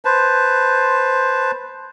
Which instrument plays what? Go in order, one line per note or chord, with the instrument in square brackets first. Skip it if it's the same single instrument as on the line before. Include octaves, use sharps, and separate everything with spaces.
[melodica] B4 C5 A5